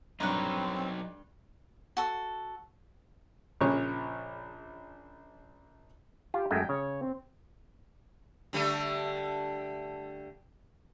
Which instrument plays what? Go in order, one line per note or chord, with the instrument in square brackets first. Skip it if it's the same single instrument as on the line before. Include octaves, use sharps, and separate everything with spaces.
[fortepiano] G2 F#6 [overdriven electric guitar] F#3 D#4 [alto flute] C4 [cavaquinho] A#4 B4 C#5
[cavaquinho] F#4 A4
[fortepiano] A#1 A#2 C#3 C#4 C#5
[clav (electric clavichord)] F4 [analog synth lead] G4
[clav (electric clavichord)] F#2 G#3 A3 [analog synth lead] G5
[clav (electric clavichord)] C#3 [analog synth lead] C#5
[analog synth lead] C4
[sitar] D3 G3 A3